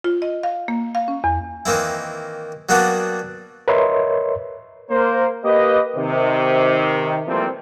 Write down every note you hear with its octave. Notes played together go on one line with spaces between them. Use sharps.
F4
D#5
F5
A#3
F5
C#4
E2
D#3 E3 A#3 C4 E4
F#3 G3 A#3 B3 D4 F#4
A#4 B4 C#5 D#5 E5 C6
A#3 A#4 C5
A#3 G4 B4 D#5
C3 D#3
E3 F3 G3 A3 A#3 C4